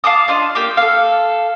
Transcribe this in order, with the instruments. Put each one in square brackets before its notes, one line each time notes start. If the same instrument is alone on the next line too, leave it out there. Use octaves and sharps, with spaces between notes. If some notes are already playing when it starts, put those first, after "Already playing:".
[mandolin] F5 A5 D6 D#6
D4 F4 D#5
A#3 G4 D6
A4 F5